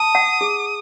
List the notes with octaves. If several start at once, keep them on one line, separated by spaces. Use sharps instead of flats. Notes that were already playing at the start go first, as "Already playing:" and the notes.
Already playing: A5 D#6
F#5
G#4